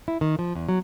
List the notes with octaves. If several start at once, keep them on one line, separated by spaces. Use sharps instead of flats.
E4
D#3
F3
E2
F#3